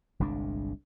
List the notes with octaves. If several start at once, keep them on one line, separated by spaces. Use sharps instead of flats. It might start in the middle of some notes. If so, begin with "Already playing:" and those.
G1 C2 G#3 D4